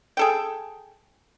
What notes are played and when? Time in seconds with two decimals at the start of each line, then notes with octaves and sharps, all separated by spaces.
0.17 G#4 A4 G5